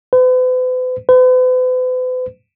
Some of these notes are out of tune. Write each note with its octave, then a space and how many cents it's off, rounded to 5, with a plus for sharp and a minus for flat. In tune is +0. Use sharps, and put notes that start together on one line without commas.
B4 +45
B4 +45